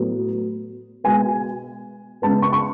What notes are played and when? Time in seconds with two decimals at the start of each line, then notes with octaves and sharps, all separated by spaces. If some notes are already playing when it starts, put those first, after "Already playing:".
Already playing: A2 F#3 B3
1.04 B2 G#3 B3 G#5
2.22 C#3 G#3 B3 A5
2.42 C#6
2.53 C#6